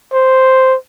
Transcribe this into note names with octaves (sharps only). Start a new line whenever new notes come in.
C5